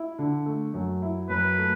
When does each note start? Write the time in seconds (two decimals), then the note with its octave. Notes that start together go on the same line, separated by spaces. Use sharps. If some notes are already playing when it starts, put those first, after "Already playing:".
Already playing: E4
0.19 D3
0.46 A3
0.74 F#2
1.02 E4
1.29 F#2 B4
1.58 A3